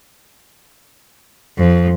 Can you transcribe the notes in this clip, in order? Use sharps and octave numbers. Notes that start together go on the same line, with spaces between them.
F2